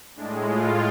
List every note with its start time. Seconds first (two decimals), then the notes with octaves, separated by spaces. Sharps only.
0.15 A2 G#3 D4
0.46 F4